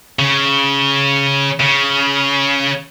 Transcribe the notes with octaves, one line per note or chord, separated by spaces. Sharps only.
C#3
C#3